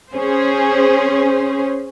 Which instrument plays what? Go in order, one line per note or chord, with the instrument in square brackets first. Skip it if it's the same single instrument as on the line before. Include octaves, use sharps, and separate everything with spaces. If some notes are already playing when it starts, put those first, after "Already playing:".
[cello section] C#4 G#4 C5